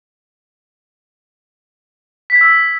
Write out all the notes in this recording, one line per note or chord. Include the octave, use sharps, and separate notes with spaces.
B6
G#6
E6